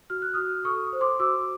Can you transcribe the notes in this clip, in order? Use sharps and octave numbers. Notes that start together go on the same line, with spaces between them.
F#4 F6
F#6
F#4 D#6 F6
A4 C#6 D#6
C5
C6 D6
F#4 D6 E6